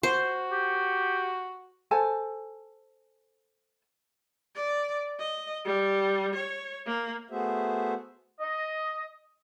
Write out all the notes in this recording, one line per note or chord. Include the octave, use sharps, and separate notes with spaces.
F#4 C5
G4
A4 C5 G#5 A5
D5
D#5
G3
C#5
A#3
A3 B3 F#4 G#4 C5 E5
D#5